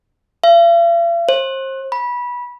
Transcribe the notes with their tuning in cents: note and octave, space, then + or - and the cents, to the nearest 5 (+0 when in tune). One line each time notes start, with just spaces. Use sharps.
F5 -45
C5 +35
B5 -20